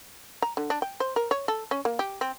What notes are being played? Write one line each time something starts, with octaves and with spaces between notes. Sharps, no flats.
A#5
D3
D4
G5
C5
A#4
C#5
A4
C#4
A#3
G4
C4